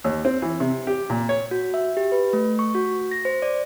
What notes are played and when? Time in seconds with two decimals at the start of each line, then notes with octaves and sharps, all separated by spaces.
0.04 D#2
0.25 C4
0.42 E3
0.60 C3
0.87 G4
1.10 A#2
1.29 C#5
1.51 F#4
1.74 E5
1.97 G4
2.12 B4
2.33 A3
2.59 C#6
2.75 F#4
3.11 A#6
3.25 C5
3.42 D5